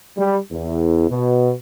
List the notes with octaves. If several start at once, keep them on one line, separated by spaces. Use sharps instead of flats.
G3
E2
B2